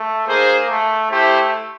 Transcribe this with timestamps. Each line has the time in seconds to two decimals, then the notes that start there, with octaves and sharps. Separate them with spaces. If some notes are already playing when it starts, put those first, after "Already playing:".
Already playing: A3
0.27 A#3 D#4 G#4 C5
0.69 A3
1.10 A3 E4 G4 C5 E5